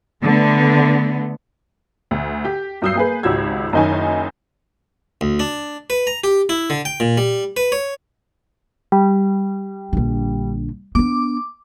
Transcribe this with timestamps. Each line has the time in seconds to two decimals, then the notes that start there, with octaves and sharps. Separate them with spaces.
0.22 D3 A3 B3
2.11 D2
2.45 G4
2.82 G2 F#3 D#6 E6 G6 C7
2.95 A#3 G#4 B4
3.23 G#1 C#2 F#4 G4 E6 G#6
3.72 F#1 F#2 D#3 D#4 C#5 G#5
5.21 D2
5.40 D4
5.90 B4
6.07 A#5
6.24 G4
6.49 E4
6.70 D3
6.85 G5
7.00 A#2
7.18 G3
7.57 B4
7.72 C#5
8.92 G3
9.93 A#1 D3
10.95 B3 D4 D6